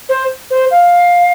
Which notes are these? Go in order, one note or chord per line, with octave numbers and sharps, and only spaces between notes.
C5
C5
F5